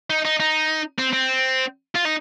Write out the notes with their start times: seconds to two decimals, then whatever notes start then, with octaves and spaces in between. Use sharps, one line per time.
0.10 D#4
0.25 D#4
0.40 D#4
0.98 C4
1.13 C4
1.95 F4
2.05 D#4